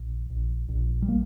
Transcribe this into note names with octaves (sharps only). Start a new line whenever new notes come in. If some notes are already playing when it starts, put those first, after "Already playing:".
Already playing: A#1
A#1
A#1
G3
A#3